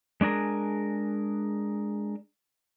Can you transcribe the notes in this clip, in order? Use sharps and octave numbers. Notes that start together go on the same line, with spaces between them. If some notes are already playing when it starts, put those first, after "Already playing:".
G#3 D4 G#4 A#4